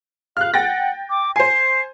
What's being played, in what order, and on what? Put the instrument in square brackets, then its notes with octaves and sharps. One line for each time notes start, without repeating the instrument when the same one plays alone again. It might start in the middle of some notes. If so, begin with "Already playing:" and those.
[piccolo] F5 [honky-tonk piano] F6 F#6
[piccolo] F#5 [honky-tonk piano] G5 A6 A#6
[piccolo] D6
[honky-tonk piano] C5 G#5 [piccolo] C7